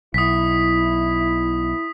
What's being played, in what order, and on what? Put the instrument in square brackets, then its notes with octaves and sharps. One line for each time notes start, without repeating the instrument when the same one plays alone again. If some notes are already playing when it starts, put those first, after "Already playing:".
[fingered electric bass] B1 [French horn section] E4 [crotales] D#6 B6